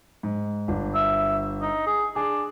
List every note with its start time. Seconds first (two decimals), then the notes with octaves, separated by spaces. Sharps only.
0.23 G#2
0.68 G1 D4
0.94 E5
1.61 D#4
1.86 G#4
2.16 D4 G#4